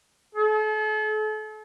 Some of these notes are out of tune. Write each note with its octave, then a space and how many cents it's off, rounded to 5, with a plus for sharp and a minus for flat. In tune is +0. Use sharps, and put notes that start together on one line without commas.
A4 -40